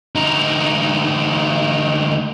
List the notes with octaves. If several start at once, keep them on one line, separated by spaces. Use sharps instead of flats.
D2 D#4